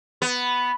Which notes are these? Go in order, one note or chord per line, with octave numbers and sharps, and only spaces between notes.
B3